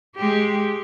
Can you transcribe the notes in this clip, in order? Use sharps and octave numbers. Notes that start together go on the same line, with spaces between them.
G#3 G4